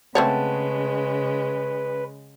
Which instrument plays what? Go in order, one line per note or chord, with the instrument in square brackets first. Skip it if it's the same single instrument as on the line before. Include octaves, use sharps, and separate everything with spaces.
[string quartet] C#3 G#3 [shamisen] A3 C4 C#5 [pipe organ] B4 [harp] F#5 A5